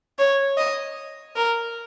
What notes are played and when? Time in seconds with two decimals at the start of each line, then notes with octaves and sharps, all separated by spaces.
0.19 C#5
0.58 D#5
1.36 A#4